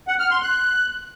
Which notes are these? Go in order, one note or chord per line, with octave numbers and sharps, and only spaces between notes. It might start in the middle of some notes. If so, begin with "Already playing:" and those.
F#5
F6
C6
F#6